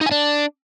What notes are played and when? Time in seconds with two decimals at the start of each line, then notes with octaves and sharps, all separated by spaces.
0.01 D#4
0.06 G#5
0.11 D4